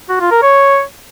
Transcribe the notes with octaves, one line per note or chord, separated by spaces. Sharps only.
F#4
F4
A#4
C#5